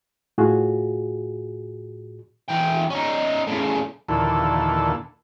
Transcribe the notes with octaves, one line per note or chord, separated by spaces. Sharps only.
A2 F4 F#4 G#4
E3 G5
C#4 D#4
A2 C#3
D#2 A#2 D3 E3 A4